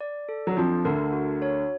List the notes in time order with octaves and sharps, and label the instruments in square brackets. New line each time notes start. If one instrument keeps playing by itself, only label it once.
[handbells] D5
A4
[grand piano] F#3
[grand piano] F2 F3 [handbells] D4
[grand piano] D2 D3 [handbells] A#4
[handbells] F#4
C#5